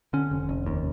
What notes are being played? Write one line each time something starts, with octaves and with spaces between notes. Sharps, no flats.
D3 C#4
F1
F1
D#2